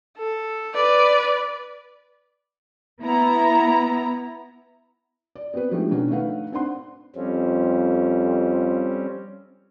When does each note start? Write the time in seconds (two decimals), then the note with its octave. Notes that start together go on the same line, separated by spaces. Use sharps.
0.17 A4
0.74 B4 D5
3.02 B3 E4 A#5
5.36 D5
5.54 B3 C4 F#4 B4
5.71 F3 G#3 A3 D4 D#4 G4
5.91 B2 D#3 C#4 D4 F#4
6.10 A3 D4 D#4 B4 F5 F#5
6.52 C4 D4 D#4 F#5 C6
7.16 F2 G3 C4 C#4